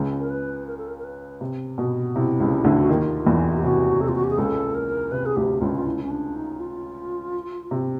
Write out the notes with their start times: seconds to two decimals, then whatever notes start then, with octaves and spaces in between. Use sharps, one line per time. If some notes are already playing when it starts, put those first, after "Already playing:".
Already playing: C#2 C#3
0.20 A#4
0.30 B4
0.67 A#4
0.78 A4
0.88 A#4
0.98 A#4
1.04 B4
1.41 C3
1.78 B2
2.15 C3 E4
2.40 C#2 C#3
2.64 D2 D3
2.81 F#4
2.89 D#2 D#3 F4
3.26 E2 E3
3.57 G4
3.63 C3 F#4
4.00 C3 A4
4.08 F4
4.15 F#4
4.24 G4
4.30 G#4
4.38 C#2 C#3 A4
4.75 A#4
5.12 C3 B4
5.26 G#4
5.36 D2 D3 G4
5.61 C#2 C#3 F4
5.75 F4
5.86 E4
6.03 C#4
6.10 D4
6.36 D#4
6.60 F4
7.71 C3